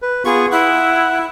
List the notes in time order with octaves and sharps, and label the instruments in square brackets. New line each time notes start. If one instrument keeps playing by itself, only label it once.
[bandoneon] B4
[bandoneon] B3 F4 C#6 [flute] G#4
[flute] E4 [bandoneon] F#5